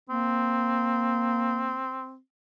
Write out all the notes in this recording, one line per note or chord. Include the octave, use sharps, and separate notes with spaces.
A#3 C4